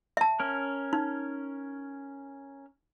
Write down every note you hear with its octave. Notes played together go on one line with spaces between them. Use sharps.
E5 A5
C#4 A#4
D#4